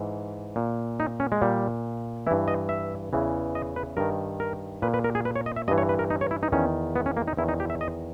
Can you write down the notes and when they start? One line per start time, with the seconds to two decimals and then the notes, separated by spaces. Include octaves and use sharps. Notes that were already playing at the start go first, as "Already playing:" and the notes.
Already playing: G#2 E3
0.56 A#2
1.00 D#4
1.20 C#4
1.32 G#3
1.42 A#2 G3
2.27 G2 E3 E4
2.48 D#5
2.69 E5
3.13 E2 C#3 E3
3.55 D#5
3.76 B4
3.97 G2 D#3 A#4
4.40 A#4
4.82 A#2 B4
4.94 B4
5.04 A#4
5.15 G#4
5.25 B4
5.36 C#5
5.46 D#5
5.56 E5
5.68 G2 E3 D#5
5.78 C#5
5.89 B4
5.99 A#4
6.10 D#4
6.21 C#5
6.31 E4
6.43 D#4
6.52 E2 D#3 C#4
6.96 B3
7.06 C#4
7.17 A#3
7.28 D#4
7.37 E2 D#3 E4
7.49 D#4
7.60 G4
7.70 E5
7.81 D#5